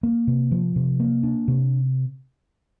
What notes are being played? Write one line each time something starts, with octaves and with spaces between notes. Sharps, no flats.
A#3
C3
F3
C3
A#3
D4
C3